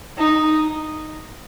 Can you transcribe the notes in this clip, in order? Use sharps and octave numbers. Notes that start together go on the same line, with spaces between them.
D#4